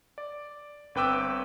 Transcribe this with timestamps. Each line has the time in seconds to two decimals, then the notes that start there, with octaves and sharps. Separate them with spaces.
0.18 D5
0.95 G1 C4 B4 G5 D6 E6